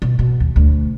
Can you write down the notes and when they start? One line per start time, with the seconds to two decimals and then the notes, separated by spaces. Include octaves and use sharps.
0.02 B2
0.19 B2
0.40 D#2
0.56 D2